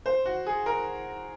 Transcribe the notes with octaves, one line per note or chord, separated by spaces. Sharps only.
C5
F#4
G#4
A#4